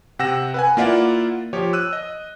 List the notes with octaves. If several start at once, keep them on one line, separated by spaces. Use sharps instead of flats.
C3 F#5 G5 E6 A#6 E7
B4 F#5 G#5
A#3 E4 F4 D5 E5 F#5
F3 G4 C#5
E6 F#6 D#7
D#5